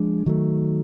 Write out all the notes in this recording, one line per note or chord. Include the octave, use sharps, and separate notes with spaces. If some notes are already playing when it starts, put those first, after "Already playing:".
Already playing: F3 G#3 D4
D#3 F#3 A3